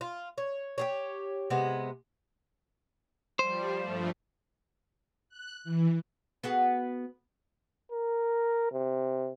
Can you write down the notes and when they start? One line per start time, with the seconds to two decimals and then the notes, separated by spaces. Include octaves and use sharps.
0.01 F4
0.38 C#5
0.78 G4 G#4 C#5
1.50 C3 G#3 B3
3.39 F3 G3 C5
3.81 G2 F3 A3
5.29 F#6
5.64 E3
6.43 B3 F#4 G#4
7.92 A#4
8.72 C3